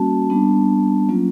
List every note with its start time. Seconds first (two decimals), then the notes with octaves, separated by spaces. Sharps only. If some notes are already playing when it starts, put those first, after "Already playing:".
Already playing: G3 A#3 C#4 F#4 A5
0.30 G3 B3 D4
1.09 F#3 A#3 C#4 F4